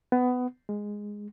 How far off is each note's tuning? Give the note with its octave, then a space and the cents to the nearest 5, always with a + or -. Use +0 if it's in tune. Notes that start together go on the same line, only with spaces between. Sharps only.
B3 +20
G#3 -5